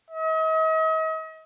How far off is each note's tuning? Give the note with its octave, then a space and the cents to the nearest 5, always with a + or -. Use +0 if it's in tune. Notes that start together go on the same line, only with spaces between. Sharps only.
D#5 +40